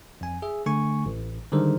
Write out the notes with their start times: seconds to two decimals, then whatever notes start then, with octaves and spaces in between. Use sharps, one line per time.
0.21 F2 G#5
0.42 G#4 E5
0.66 D3 A3 G#5 C#6
1.06 A1
1.52 D3 D#3 G3 G#3 A#4 C5